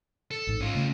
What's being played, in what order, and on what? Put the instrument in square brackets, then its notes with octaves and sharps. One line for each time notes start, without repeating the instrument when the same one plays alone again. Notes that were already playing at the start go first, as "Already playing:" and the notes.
[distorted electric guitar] A4
[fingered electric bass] A1 G#2
[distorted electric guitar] C#4 F4
[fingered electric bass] C#3 A3